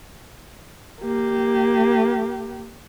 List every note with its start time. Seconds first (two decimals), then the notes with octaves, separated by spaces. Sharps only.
1.02 A#3 G4